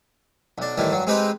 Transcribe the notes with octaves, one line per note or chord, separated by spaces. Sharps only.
B1 D4
A2 D#3 E3 G3
G2 F#3
G#3 C4 D#4 G4 B4 D#5